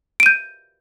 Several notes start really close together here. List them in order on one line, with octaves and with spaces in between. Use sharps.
D7 D#7 G6